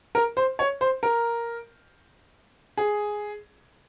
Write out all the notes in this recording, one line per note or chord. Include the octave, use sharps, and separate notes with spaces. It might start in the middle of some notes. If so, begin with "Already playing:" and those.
A#4
C5
C#5
C5
A#4
G#4